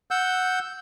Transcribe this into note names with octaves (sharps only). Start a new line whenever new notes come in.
F#5 E6 G6